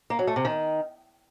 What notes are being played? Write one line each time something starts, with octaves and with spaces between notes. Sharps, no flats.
A#3
F#3
A3
C3
D#3